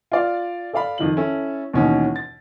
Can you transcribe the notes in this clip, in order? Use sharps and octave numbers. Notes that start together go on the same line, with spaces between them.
F4 D5 F5
A4 D5 F5 B5
F2 D#3 F3 F#7
C#4 E4 A4
D#2 B2 E3 C#4 D#4
A6